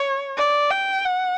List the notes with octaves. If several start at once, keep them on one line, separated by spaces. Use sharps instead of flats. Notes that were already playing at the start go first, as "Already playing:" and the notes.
Already playing: C#5
D5
G5
F#5